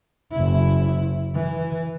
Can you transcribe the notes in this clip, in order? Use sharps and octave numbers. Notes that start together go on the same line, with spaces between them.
F#1 E4
E3